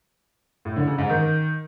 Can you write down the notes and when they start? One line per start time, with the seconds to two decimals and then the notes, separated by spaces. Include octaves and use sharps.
0.65 A2
0.76 D3
0.87 C#3
0.98 G#2
1.09 D#3